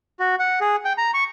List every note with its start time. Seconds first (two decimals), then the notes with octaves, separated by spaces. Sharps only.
0.20 F#4
0.39 F#5
0.61 G#4
0.85 G5
0.98 A#5
1.14 C#6